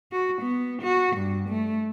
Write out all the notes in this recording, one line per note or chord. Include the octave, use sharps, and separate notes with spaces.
F#4
B3
F#4
G2
A3